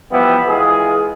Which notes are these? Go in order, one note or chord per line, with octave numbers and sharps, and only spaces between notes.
E3 F3 G3 B3 E4 G4
E3 G#3 F4 G#4